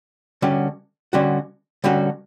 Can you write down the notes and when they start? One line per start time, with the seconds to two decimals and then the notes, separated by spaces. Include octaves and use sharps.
0.42 D3 G3 C#4 F#4
1.13 D3 G3 C#4 F#4
1.84 D3 G3 C#4 F#4